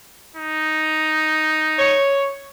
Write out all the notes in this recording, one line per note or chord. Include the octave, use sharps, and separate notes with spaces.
D#4
C#5